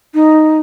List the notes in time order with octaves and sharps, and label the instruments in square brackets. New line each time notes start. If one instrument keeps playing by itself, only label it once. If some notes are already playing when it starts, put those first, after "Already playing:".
[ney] D#4